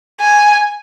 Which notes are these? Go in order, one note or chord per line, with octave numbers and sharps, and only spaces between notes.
G#5